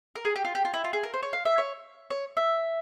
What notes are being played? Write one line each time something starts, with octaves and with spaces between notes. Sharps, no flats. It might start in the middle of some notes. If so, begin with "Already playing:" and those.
A#4
G#4
G4
F4
G4
F4
E4
F4
G#4
A#4
C5
C#5
F5
E5
C#5
C#5
E5